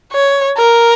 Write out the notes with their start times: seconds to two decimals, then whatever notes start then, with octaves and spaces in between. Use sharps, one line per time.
0.12 C#5
0.58 A#4